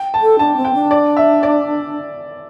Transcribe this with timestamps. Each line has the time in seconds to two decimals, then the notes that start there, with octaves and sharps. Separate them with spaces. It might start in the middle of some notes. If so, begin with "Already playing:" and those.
Already playing: G5
0.14 A5
0.22 A4
0.39 D4 A5
0.57 C4
0.65 G5
0.74 D4
0.91 D5
1.17 E5
1.43 D5